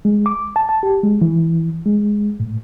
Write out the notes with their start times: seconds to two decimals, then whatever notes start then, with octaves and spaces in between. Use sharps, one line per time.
0.05 G#3
0.26 D6
0.56 A5
0.69 A5
0.83 G4
1.03 G#3
1.21 E3
1.86 G#3
2.40 A2